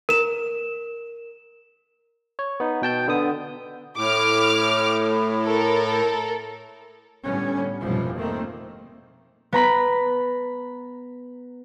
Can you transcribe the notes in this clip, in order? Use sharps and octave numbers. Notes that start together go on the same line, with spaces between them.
A#4 E7
C#5
B3 D#4
B2 G5 A5 G6
D3 B3 D#6
A2 D6 F6
A4 A#4
A2 D3 G3 B3 C#4
F1 G#2 B2 E3 F3 G3
D#3 A3 A#3 C4
B3 A#5 B5 B6